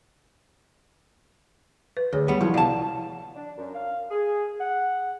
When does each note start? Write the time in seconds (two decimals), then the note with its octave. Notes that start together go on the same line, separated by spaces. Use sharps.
1.97 B4
2.13 D2 G#4 C#5
2.28 G3 B3
2.41 F3 F#3 E4
2.54 C2 D5 F5 F#5 A5
3.36 D4
3.57 F#2
3.75 F5
4.10 G#4
4.60 F#5